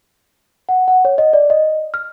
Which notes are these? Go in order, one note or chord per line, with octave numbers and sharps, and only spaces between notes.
F#5
F#5
C#5
D#5
D5
D#5
F6